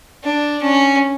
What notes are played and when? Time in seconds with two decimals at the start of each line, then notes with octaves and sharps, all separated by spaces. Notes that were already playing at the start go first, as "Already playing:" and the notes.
0.23 D4
0.62 C#4